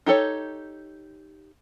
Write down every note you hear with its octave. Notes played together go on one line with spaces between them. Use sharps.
D#4 G4 A4 C#5